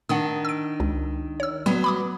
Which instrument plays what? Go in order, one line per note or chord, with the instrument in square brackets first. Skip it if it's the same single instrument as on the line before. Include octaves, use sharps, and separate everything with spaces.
[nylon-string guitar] D#3 D4 [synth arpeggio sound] F#5 D#6
[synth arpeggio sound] E6 D7
C#2
C#5 E6
[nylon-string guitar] F#3 B3 [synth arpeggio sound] G3
[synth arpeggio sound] B5 D6 D#6